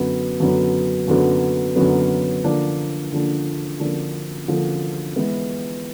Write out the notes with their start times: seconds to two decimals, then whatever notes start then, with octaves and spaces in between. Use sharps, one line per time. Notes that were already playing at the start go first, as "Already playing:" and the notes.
Already playing: F#2 D3 F#3 B3
0.40 F#2 D3 F#3 B3
1.08 F#2 D3 F#3 B3
1.76 F#2 D3 F#3 B3
2.44 D3 F3 A#3 D4
3.12 D3 F3 A#3 D4
3.80 D3 F3 A#3 D4
4.48 D3 F3 A#3 D4
5.15 E3 G#3 B3 E4